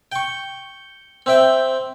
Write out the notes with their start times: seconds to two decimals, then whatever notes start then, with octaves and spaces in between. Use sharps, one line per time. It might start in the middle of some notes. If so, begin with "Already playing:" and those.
0.12 G5 C#6
1.26 C4 E5 G5